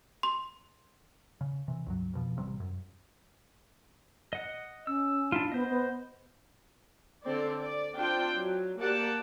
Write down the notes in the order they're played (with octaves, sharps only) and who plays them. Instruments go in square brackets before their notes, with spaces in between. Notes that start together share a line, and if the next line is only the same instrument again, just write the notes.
[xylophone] C6
[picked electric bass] C#3
C3 E3
C#2 G2 F#3
F2 B2 F3
A1 C3 G3
F#2
[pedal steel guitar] D#5 F#5
[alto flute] C#4 [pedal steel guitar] E6
[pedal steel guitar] D4 E4 F4
[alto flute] B3 [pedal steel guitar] C5 D#5
[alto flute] B3
[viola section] D3 C4 A4 D5
D5
C4 D4 F4 G5
F#3
A#3 G4 D5 F#5 A5